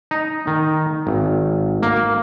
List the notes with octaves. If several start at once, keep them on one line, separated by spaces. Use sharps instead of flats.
D#4
D#3
G#1
A#3